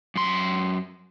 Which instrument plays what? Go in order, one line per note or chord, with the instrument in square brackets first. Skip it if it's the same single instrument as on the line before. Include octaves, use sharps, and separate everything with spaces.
[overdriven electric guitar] F#2 C6